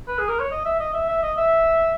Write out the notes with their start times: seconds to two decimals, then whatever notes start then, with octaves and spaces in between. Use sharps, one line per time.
0.08 B4
0.18 G#4
0.29 A#4
0.39 C#5
0.51 D#5
0.65 E5
0.80 D#5
0.94 E5
1.09 E5
1.22 D#5
1.37 E5